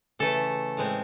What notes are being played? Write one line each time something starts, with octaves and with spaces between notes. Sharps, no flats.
C#3 E3 A3 A4
A2 G#3 C4